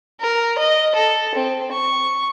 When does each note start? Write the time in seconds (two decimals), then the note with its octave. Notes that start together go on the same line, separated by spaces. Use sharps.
0.20 A#4
0.58 D#5
0.95 A4
1.35 C4
1.72 C#6